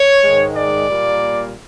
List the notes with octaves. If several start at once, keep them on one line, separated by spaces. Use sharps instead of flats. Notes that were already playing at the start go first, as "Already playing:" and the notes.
Already playing: C#5
G#2 D#3 G#3
D5
A#2 G3 A#3